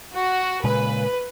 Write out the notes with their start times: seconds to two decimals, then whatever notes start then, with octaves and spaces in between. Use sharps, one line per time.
0.14 F#4
0.64 A#2 C#3 G#3 B4